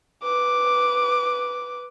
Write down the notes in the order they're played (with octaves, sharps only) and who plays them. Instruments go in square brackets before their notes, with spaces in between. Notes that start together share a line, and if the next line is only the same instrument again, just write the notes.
[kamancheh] B4 D6